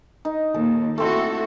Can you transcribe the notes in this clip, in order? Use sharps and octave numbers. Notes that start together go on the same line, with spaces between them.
D#4
D#2 A#2 A4
A3 C4 E4 F#4 A4